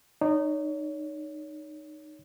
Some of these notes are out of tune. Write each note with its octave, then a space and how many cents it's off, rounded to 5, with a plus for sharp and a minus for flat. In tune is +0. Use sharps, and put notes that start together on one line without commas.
D#4 -20 C#5 +30